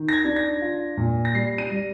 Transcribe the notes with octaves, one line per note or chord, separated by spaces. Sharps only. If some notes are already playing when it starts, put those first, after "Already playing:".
Already playing: D#3
A#6
G#6
D4
A#6
F4
A#2
A#6
G3 C7
D#7
G3